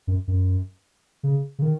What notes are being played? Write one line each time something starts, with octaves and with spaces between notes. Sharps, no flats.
F#2
F#2
C#3
C#3
D#3